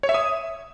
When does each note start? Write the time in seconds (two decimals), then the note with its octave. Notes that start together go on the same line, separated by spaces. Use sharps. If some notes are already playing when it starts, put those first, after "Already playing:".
0.03 C#5
0.09 E5
0.14 D#6